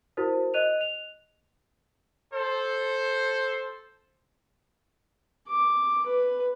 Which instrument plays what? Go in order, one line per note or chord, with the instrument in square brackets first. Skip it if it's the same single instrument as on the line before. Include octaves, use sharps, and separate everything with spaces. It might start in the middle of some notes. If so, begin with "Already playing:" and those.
[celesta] E4 F#4 A#4 C5
D#5 F#6 D#7 F7
F7
[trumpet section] A4 C5
[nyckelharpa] D6
B4